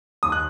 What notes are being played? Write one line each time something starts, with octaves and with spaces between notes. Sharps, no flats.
D#2 D#6
F#6